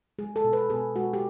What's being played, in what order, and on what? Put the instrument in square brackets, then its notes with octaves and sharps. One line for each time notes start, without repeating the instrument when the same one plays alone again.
[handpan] G#3 G#4
A4
B2
B4
B2 G#4
G#3 F#4
G4